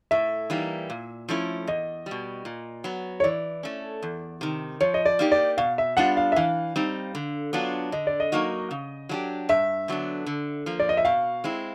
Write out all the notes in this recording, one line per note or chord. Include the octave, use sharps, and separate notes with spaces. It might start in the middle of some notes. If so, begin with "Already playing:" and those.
A2 E5
E3 G3 A#3 D#4
A#2
F3 A3 C#4 E4
E2 D#5
B2 G3
A#2
F#3 B3
C#5
E3 D5
A3 C#4
E2
C3 D#3
F3 C#5
D#5
D5
A#3 D#4 G4
D5
B2 F5
E5
G3 B3 D4 F4 F#5
F5
E5
E3 F5
G3 C4 D#4
D3
F#3 B3 D4 F4
D3 D#5
D5
D#5
F#3 A#3 D#4 F#4
C#3
F#3 A3 D4 G4
G2 E5
D3 F#3 B3 D4
D3
F3 A#3
D5
D#5
E5
B2 F5
G#3 C4 E4